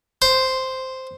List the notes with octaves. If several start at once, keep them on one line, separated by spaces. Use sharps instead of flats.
C5